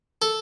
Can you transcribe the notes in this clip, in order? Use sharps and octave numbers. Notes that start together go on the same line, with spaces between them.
A4